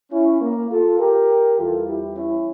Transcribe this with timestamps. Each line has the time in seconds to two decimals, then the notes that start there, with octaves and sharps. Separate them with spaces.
0.12 C#4 E4
0.41 A#3
0.70 F4 A4
0.99 G4 A#4
1.58 E2 E3 G3 F4 A4
1.87 E4 G4
2.16 C#4 E4